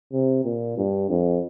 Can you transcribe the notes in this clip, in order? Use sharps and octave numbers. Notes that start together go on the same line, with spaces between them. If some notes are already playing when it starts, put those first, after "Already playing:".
C3
A#2
G2
F2